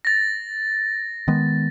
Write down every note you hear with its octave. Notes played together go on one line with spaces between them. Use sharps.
A6 A#6
D#3 G#3 B3